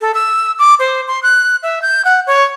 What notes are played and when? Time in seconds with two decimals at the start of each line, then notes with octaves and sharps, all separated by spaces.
0.01 A4
0.14 E6
0.59 D6
0.79 C5
1.07 C6
1.23 F#6
1.63 E5
1.82 G6
2.05 F#5
2.27 C#5